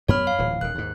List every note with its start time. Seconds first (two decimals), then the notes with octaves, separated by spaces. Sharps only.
0.08 F#2 B3 C#5 B5 F6
0.27 F5
0.39 D1 A#2 E3
0.61 D#1 D#3 F#6
0.75 D#2 G#2